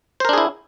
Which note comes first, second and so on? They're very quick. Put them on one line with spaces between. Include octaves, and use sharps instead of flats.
C5 A#4 D4 G#4 E4